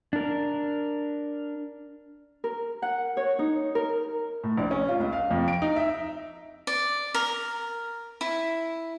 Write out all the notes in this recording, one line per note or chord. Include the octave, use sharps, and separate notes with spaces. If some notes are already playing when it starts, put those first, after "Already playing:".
D4 A#4
A#4
F#5
C#5
D#4
A#4
A2
A#1
C#4
F4
C#2
F5
F2
D7
D#4
E5
D5
A#4
E4